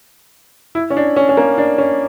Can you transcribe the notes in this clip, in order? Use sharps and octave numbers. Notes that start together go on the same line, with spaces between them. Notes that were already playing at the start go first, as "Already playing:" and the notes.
E4
C#4
D4
C#4
C#4
A#3
D4
C#4